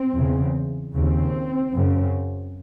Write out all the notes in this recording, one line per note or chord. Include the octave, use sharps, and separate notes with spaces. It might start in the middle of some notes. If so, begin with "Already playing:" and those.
Already playing: C4
E2 C#3
D#2 C#3 C4
F#2 C#3